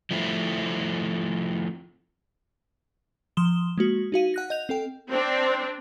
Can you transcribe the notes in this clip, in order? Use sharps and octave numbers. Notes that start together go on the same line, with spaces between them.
F3 A3 C4 E4
F3 C6 D#6 E7 G7
G#3 A#3 F#4
D#4 F#4 F5 D#7
F#5 F#6 A#6
D#5 G6 F7
C4 A4 G5
C4 D4